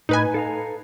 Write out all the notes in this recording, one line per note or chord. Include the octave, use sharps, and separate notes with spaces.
A2 D#4 B4 G#5
A4 F5 A#5